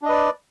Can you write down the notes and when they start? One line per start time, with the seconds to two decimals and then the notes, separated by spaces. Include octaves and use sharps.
0.02 D4
0.05 D#5
0.09 B4
0.12 D5